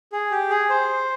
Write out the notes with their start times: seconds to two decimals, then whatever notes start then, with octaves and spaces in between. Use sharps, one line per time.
0.12 G#4
0.31 G4
0.50 G#4
0.70 C5